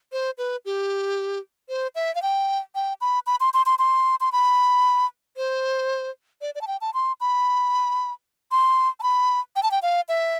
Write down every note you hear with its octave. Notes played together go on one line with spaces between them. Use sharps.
C5
B4
G4
C5
E5
F5
G5
G5
B5
B5
C6
C6
C6
C6
C6
B5
C5
D5
D5
A5
G5
A5
C6
B5
C6
A5
B5
G5
A5
G5
F5
E5